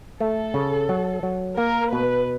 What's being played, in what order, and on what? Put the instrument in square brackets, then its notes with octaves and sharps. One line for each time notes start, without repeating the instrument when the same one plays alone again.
[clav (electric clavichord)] A3 [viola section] A4
[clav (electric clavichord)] C#3
F#3
F#3
[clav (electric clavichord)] A#3 [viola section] A#4
[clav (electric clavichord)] B2 [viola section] B4